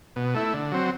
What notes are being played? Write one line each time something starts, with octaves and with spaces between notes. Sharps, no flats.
B2
A3 E4
D3
F#3 C4